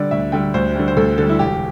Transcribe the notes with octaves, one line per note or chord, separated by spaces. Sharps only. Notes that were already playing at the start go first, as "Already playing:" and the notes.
Already playing: D3 G3 D5
D2 E5
D3 G3 G5
D2 C5
D3 G3
C5
D2 A4
D3 G3 A4
E4
E1 G4